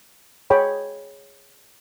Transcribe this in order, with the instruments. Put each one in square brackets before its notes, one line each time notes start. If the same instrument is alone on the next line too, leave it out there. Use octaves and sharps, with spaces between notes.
[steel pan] G#4 C#5 G5 B5